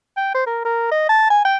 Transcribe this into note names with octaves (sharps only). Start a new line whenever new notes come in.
G5
C5
A#4
A#4
D#5
A5
G#5
G5